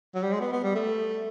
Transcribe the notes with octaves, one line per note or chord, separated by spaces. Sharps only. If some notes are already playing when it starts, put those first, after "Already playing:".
F#3
G3
G#3
B3
B3
G3
A3